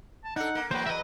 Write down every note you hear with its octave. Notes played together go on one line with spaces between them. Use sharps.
A5
D4 D#4 A4 F#5
A#3
E2 F#3 A#3 B4 C5 G5
B4 D#5 E5